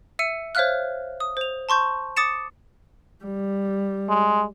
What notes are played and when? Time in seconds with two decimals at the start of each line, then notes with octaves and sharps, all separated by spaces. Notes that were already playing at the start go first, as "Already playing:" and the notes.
0.19 E5 E6 C#7 D#7
0.55 C5 C#5 E5 F5 F6 F#6
1.20 D#6
1.37 C5 F7
1.69 A5 C6 C#6 G6
2.17 D6 D#6 A6 C#7 E7
3.25 G3
4.09 G#3